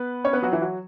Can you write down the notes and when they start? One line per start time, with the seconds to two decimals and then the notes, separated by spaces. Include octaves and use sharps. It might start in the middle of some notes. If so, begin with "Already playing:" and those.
Already playing: B3 B4
0.24 C#4 C#5
0.33 B3 B4
0.42 F#3 F#4
0.52 E3 E4
0.61 F#3 F#4